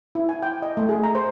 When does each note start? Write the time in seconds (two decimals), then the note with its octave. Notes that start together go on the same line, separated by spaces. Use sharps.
0.15 E4
0.29 G#5
0.43 G5
0.62 D#5
0.77 A3
0.89 G#4
1.03 A#5
1.15 C5